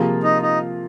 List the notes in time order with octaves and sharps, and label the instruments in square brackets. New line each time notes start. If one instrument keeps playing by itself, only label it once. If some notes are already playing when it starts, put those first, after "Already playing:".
Already playing: [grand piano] C3 F3 A#3 F4 G#4
[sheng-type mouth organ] D#4
D#4